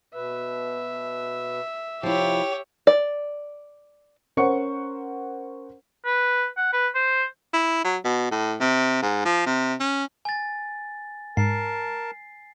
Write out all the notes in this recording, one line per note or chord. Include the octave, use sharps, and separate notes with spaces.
B2 B4 E5
C3 F3 E4 G4 C#5
D5
C#4 A#4 C5 F#5 C#6 C#7
B4
F#5
B4
C5
E4
F#3
B2
A2
C3
G#2
F3
C3
C#4
G#5 A6
G#2 A#4 A5 C7